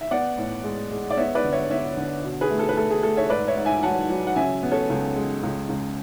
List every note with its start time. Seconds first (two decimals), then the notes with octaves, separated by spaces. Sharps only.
0.01 E5
0.11 B3 D5 F#5
0.38 A2
0.64 G#3
0.91 G#3
1.10 D5
1.17 B3 C#5 E5
1.35 B4 D5
1.44 D3
1.53 C#5 E5
1.71 B3 C#5 E5
1.97 D3
2.24 B2
2.41 G#4 B4
2.50 A3
2.59 A4
2.69 B4
2.77 A3 A4
2.90 G#4
3.03 A3 A4
3.17 C#5 E5
3.30 G#2 B4 D5
3.48 C#5 E5
3.57 G#2
3.65 E5 G#5
3.83 F#3 F#5 A5
4.10 F#3
4.27 F#5
4.36 C#3 E5 G#5
4.63 B3
4.72 A4 C#5
4.90 C#2
5.16 G#3
5.43 C#2
5.69 C#2